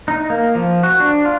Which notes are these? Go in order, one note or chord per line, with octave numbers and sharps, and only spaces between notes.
D#4
A#3
F3
F#4
D4
F4